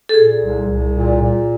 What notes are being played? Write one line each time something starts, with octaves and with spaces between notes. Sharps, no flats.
A4
A#2 G#4
C2
C2
A#2
A#2